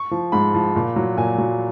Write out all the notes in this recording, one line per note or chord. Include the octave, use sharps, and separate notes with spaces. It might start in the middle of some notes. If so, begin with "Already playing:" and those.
Already playing: C#6
F3
G#2 B5
F3
A#2
F#3
A#2 G#5
F#3